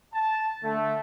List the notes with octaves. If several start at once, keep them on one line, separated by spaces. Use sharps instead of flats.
A5
D3 A3